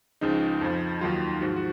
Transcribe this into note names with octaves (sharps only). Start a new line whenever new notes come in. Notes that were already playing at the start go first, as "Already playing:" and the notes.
C#2 C#3 F3 D#4
F2 F3
D#2 D#3 F#3 F4
G#2 F3 F#4
F#4